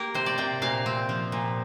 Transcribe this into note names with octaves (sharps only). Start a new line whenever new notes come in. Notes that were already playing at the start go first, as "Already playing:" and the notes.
Already playing: A#3 G4 A#4
C3 C5
D5
C3 G5
A#2 F5
C4
F3
A#2